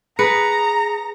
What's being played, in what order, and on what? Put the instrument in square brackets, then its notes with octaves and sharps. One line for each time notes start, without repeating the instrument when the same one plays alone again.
[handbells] G#4 A#6 C#7 [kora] B4 [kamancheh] A#5